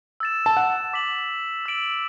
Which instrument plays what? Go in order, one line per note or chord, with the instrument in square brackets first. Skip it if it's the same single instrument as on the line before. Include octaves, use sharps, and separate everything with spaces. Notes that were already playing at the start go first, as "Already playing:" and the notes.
[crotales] E6 A6 E7
[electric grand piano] A5
F#5
[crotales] D6 B6 F#7
E6 D7 F#7